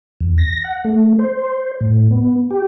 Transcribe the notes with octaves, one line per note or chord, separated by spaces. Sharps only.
E2
A#6
F#5
A3
C5
A2
B3
G4